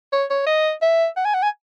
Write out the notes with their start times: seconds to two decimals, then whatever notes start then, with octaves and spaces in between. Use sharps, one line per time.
0.13 C#5
0.30 C#5
0.47 D#5
0.82 E5
1.17 F#5
1.25 G#5
1.34 F#5
1.43 G#5